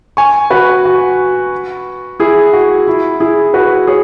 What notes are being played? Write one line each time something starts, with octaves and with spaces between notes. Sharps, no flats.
G#5 C#6
F#4 B4
F#4
E4 G#4
F#4
E4
E4 G#4
F#4 B4
G#4 C#5